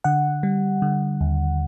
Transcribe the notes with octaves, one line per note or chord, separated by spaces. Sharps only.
D3 F#5
G3
D3
D#2